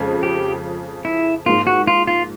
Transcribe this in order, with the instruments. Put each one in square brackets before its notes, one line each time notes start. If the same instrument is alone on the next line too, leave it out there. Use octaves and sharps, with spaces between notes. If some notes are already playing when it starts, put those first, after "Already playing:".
Already playing: [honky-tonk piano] F2 C#3 F3 G#3
[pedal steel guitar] G4
E4
[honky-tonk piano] G#2 F3 A#3 [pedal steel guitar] F4
[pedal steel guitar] F#4
F4
F4